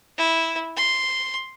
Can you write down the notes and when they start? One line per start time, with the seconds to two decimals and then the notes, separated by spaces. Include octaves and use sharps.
0.18 E4
0.77 C6